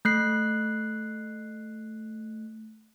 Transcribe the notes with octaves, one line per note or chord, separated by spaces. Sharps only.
A3 F#6 C7